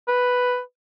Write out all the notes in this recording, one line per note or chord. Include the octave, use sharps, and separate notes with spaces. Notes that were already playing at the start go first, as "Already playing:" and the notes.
B4